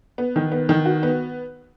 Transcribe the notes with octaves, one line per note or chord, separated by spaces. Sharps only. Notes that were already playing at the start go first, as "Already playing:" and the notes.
B3
D#3
B3
D#3
F#4
B3